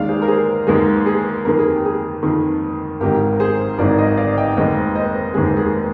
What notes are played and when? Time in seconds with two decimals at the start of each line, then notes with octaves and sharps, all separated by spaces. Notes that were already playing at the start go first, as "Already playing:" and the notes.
Already playing: D#2 D#3 G#3 D5 F5
0.08 G#4 C5
0.22 A#4
0.28 G#4 C5
0.67 D#2 D#3 G#3 G#4
1.06 G#4
1.45 F2 D#3 A#3 A#4
1.59 G#4
1.72 G4
1.85 G#4
2.23 F2 D#3 A#3
3.00 G#1 G#2 D#3 G4 A#4
3.33 A#4
3.40 G#4 C5
3.78 G#1 G#2 D#3 A#4 D5
3.98 C5 D#5
4.17 D5 F5
4.37 D#5 G5
4.57 F1 D#2 D#3 G#3 C4 C5 D#5
4.95 C5 D#5
5.34 F1 D#2 D#3 G#3 C4 G#4
5.46 G4
5.56 G#4